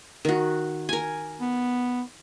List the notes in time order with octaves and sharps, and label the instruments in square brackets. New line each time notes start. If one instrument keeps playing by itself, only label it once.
[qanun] D#3 F#4
A#4 G#5
[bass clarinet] B3